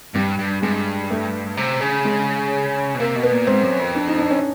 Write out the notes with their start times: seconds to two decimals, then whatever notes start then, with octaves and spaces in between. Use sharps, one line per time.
0.15 G2 G3
0.39 G2
0.62 G2 G#3
1.11 A3
1.57 C3
1.81 C#3
2.05 G#3
2.95 B2
3.00 C3 A#3
3.16 B2
3.23 B3
3.32 A#2
3.47 G#2 C4
3.63 F#2
3.79 F2
3.95 D4
4.07 D#4
4.18 D4
4.30 C#4